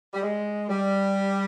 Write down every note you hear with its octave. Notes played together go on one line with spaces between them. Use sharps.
G3
G#3
G3